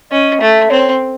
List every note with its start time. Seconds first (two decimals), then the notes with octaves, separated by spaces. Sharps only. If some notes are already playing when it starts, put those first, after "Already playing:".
0.11 C#4 D#5
0.41 A3 E5
0.70 C4 C#5